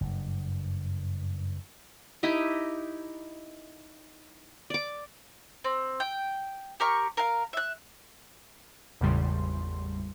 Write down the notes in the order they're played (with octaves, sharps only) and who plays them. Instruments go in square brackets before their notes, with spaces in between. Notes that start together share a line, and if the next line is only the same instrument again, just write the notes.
[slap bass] F#1 G2
[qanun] D#4 E4 G4 D#5
D5 D6
[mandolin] C4
G5
G4 A#4 C#6
A#4 F5
E5 F#6
[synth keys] G#1 E2 A2 C#3 G3 C6